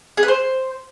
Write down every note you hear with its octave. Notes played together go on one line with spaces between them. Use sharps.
G#4
B4
C5